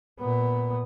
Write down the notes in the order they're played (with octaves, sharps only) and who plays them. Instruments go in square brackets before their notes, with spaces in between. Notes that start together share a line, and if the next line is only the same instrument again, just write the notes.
[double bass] A#2 B3